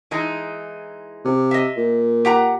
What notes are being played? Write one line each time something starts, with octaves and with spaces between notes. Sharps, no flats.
E3 G#3 D#4
C3
D#5 E5
A#2
G4 F#5 A#5